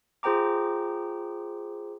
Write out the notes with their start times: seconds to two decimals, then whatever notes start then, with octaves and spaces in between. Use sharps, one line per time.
0.23 F4 G#4 C5 G5 A#5 D6